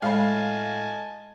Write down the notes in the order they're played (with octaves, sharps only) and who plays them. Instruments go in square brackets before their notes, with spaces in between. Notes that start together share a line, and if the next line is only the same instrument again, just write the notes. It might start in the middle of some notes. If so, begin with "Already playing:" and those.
[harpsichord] A2 [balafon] G#3 C#5 B5 [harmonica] D#5 G#5 A5 [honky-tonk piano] F5